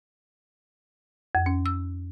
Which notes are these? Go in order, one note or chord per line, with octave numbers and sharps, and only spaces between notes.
F2
C#4
E6